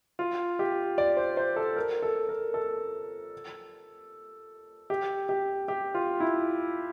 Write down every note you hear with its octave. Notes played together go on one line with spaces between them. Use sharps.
F4
G4
D5
C5
C5
A4
A#4
A4
A#4
A4
G4
G4
G4
F4
E4